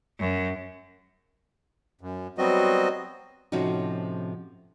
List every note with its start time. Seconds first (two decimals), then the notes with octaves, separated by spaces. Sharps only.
0.19 F#2
2.01 F#2
2.38 F#3 G3 B3 C4 F#4 D#5
3.52 A2 C3 F3 C#4 D#4 F#4